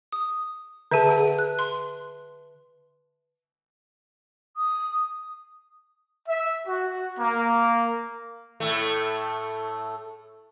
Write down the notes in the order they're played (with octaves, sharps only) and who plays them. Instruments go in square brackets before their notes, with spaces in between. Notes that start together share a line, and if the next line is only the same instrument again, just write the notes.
[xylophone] D#6
[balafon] D3 G#4 [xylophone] B4 E5 A5
[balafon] G#4 F#5
[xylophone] F#6
[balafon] C6
[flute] D#6
[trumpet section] E5
F#4
A#3
[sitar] A2 A3